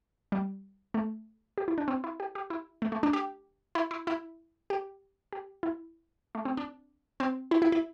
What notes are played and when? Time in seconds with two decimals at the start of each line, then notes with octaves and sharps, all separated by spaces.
0.32 G3
0.94 A3
1.58 G4
1.68 E4
1.78 D4
1.88 C4
2.04 E4
2.20 G4
2.35 G4
2.50 E4
2.82 A3
2.92 A3
3.03 D4
3.13 G4
3.75 E4
3.91 E4
4.07 E4
4.70 G4
5.33 G4
5.63 E4
6.35 A3
6.45 C4
6.57 D4
7.20 C4
7.51 E4
7.62 E4
7.72 E4